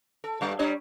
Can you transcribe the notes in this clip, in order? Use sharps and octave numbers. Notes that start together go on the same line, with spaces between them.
A4
G2 G3
G3 D4 C#5